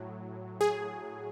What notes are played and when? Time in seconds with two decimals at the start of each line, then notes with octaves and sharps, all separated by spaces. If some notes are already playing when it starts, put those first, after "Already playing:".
Already playing: A2 F#3
0.61 G#4